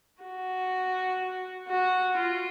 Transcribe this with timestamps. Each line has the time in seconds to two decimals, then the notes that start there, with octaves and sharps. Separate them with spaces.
0.22 F#4
1.68 F#4
2.17 F4